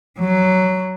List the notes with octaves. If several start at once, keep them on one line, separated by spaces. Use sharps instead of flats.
F#3